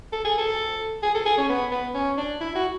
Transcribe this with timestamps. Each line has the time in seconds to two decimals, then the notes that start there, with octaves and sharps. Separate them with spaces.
0.12 A4
0.25 G#4
0.38 A4
1.03 G#4
1.15 A4
1.25 G#4
1.38 C#4
1.49 B3
1.71 B3
1.94 C#4
2.17 D4
2.41 E4
2.55 F#4